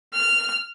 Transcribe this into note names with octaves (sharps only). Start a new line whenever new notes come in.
F6